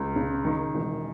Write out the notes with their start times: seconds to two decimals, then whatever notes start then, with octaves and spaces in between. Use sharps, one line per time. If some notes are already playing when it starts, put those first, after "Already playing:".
Already playing: C#2
0.16 C#3
0.45 D#3
0.75 E1